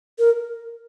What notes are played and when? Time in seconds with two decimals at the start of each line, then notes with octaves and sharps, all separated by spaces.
0.19 A#4